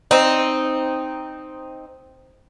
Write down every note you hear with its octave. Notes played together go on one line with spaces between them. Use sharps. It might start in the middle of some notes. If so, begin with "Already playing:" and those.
C4 D#4